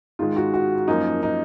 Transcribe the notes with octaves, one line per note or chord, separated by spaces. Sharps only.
G#2 D#3 G#3 F4
F#4
F#4
F#2 F3 A#3 D#4
D#4